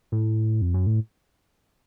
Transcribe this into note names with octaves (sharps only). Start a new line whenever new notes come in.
A2
F2
F#2
A2